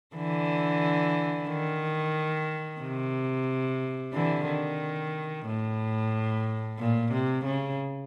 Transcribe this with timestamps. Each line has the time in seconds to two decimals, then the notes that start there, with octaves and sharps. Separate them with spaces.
0.16 D3 E3
1.49 D#3
2.81 C3
4.14 D3 E3
4.47 D#3
5.46 A2
6.79 A#2
7.13 C3
7.45 C#3